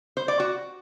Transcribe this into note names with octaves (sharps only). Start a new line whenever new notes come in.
C5
D5
F#4